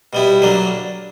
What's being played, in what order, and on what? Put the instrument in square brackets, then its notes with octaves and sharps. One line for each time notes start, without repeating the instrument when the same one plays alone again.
[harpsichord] B2 G3 B3 E4
D3 F#3 A#3 D4